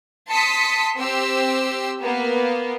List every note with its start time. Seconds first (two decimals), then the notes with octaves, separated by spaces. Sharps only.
0.30 A5 C6 D#6 B6 C#7
0.98 C4 G4 C5 E6
2.01 A#3 B3